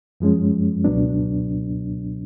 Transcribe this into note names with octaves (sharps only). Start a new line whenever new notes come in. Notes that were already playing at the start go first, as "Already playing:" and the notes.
F#2 F3 G#3 C#4
C#2 B2 F#3 B3 D4